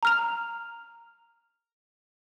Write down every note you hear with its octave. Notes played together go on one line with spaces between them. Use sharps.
A#5 F6 F7